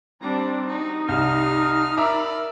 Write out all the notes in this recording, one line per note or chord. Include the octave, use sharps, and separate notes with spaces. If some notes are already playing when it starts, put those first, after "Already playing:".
G3 C4 D4 A#5
D#4 F#4
C2 G4 D#6 F6
A#4 D5 E5 A#5 B5 D6 E6